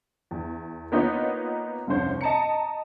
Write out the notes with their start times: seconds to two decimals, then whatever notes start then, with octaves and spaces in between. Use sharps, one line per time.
0.31 E2
0.92 A#3 B3 D#4 F4 C#5
1.87 F1 C2 G2 C#3 C5 C#5
2.21 D#5 A5 A#5 C#7